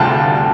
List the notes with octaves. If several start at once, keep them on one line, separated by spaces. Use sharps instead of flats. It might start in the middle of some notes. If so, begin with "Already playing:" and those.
Already playing: D2 C3 G3 F4 A5